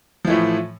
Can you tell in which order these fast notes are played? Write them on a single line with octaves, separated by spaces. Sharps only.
F3 E3 A3 A2